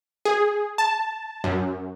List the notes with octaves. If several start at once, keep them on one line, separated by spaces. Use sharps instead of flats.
G#4
A5
F#2